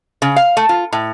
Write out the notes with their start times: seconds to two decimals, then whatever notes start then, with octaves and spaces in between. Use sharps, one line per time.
0.22 C#3
0.36 F5
0.57 A3
0.69 F4
0.93 A2